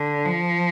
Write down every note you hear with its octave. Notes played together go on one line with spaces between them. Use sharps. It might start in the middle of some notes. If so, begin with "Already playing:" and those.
Already playing: D3
F3